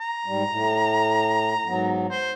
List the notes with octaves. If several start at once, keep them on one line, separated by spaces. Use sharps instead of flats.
A#5
G#2 G3
A2
G#2 F#3 B3
C5